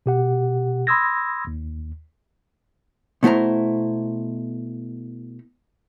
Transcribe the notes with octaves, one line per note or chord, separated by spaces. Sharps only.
B2 G4 F#5
B5 C6 D#6 E6 G#6 A#6
D#2
B2 A3 E4 C5 A#5